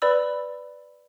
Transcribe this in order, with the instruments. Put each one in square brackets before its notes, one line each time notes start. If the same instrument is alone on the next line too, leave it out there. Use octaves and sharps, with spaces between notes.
[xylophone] B4 D5 B5 E6